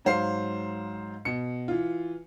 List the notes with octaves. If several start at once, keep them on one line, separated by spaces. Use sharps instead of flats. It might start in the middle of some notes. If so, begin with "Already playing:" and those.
G#2 F#3 C5 F5 C7
B2 C#7
E3 F4